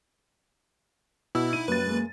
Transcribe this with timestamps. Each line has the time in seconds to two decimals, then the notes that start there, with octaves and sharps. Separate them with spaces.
1.35 B2 E4 E6
1.53 D#4 D#7
1.68 F#2 G3 A#3 B4 A6
1.86 G#3 A#3